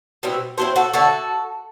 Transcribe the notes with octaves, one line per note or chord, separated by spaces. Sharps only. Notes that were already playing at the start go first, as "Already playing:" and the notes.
B2 G3 C4 E4
F#3 C4 E4 A4 C5
F#4 A4
D3 A3 D4 F#4 A4